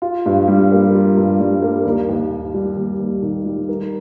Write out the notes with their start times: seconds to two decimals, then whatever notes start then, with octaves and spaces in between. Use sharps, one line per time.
0.02 F4
0.26 G2
0.48 G3
0.72 A#3
0.94 F4
1.17 G2
1.40 G3
1.62 A#3
1.85 D#2
2.09 D#2
2.31 D#3
2.54 G3
2.77 D#2
3.00 D#2
3.22 D#3
3.45 G3
3.69 A#4